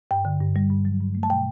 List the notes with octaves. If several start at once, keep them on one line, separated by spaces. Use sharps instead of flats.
G2 G5
D3
G2
G3
G2
F#3
G2
A3
A5
B2 G5